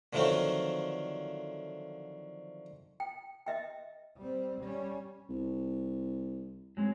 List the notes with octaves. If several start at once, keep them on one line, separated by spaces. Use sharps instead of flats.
D3 D#3 F3 F#3 A3 C4
G5
D#5 E5 G5
G3 C4
G3 C#4
C2
F#3 G#3 C4